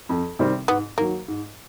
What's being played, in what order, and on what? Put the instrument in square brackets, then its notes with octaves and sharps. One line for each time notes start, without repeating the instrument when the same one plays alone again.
[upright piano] F2
C3 D#3 G3 C4
[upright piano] G#2 [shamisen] B3
[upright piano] D#3 F#3 [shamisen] A#3
[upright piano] G#2